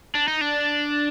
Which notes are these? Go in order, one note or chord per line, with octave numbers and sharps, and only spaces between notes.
D4
D#4
D4